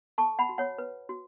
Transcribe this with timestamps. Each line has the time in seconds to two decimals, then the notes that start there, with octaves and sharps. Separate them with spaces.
0.18 A4 A5 C#6
0.39 F#5 B5
0.49 F#4
0.58 C#5 F#5
0.78 B4
1.09 F#4